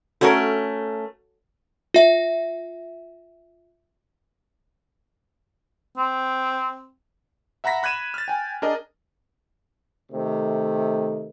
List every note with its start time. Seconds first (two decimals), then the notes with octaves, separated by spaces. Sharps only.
0.21 A3 C#4 F#4 A4 A#4 C#5
1.94 F4 E5
5.97 C4
7.64 E5 F#5 A#5 B5 A#6 B6
7.83 B5 F#6 G#6 A#6 D#7 E7
8.14 F6 A6
8.28 G5 G#5
8.62 D4 G#4 A#4 D#5
10.12 C3 D#3 A3